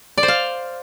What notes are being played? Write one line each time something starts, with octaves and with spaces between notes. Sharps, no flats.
D5
C5
F5